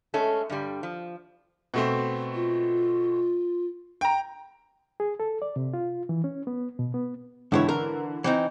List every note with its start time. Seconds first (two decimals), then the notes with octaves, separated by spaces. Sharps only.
0.14 G#3 A3 C#4 A4
0.50 G2 D3 G3
0.83 F3
1.74 B2 A3 C4
2.34 F4
4.01 G5 A#5
5.00 G#4
5.20 A4
5.42 D5
5.56 C3
5.74 F4
6.09 E3
6.24 C#4
6.47 B3
6.79 B2
6.94 B3
7.52 C#2 D3 E3 E4 C#5
7.69 A#4
8.24 E3 C4 D#4